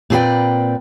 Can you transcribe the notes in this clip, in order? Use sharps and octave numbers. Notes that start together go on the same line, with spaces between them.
A#2 C4 G#4 B4 D5 G5